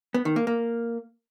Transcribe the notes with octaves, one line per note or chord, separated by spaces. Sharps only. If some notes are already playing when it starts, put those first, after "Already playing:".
B3
D#3
A#3
A#3